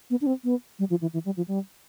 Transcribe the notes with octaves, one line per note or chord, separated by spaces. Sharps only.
B3
D4
C4
B3
G3
F3
E3
E3
G3
F3
G3